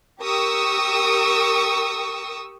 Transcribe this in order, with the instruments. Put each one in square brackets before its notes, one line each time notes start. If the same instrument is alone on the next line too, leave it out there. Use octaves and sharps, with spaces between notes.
[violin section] G4 A#4 C#6 D#6 E6